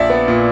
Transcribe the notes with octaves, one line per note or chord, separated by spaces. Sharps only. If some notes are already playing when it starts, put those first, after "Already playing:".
Already playing: A#1 D5 E5
B3
A#2